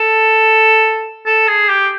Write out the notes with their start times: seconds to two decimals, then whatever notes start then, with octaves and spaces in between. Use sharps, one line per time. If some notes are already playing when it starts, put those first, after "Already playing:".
Already playing: A4
1.26 A4
1.47 G#4
1.69 G4